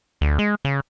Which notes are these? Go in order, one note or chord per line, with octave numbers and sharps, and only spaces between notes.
D2
G#3
C#3